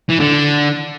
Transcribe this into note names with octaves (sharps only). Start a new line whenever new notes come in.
E3
D3